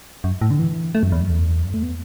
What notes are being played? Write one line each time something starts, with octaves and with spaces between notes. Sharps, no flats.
F#2
A2
D3
E3
A3
F#2
E2
F#2
E2
F#2
A3
B3